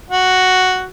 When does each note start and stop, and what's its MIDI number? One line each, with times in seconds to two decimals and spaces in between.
0.10 0.86 66